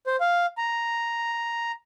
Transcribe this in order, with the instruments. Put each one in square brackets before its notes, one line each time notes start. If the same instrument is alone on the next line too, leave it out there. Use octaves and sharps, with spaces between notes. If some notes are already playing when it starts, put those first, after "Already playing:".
[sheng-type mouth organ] C5
F5
A#5